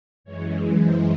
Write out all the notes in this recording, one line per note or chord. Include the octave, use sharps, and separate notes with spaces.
F#2 E3 G#3 C#5
C5